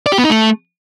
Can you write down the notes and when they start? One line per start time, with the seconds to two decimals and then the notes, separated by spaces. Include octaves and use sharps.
0.06 D5
0.12 G4
0.18 B3
0.24 D#4
0.30 A3